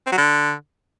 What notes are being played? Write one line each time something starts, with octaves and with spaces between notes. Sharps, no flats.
C4
F#3
D3